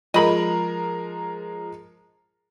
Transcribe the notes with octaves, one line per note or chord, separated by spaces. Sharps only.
F3 G#3 A#4 D#5 B5